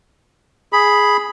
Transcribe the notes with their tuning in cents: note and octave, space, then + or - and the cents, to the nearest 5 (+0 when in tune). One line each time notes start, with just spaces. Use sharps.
G#4 +0 B5 +0